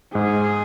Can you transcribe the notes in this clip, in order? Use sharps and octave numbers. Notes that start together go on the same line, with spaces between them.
G#2 G#4